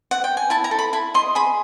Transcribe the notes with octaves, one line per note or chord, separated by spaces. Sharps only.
F#5
G5
G#5
E4 A5
A#5
A4
B5
E4 B5
D#5 C6
G#4 B5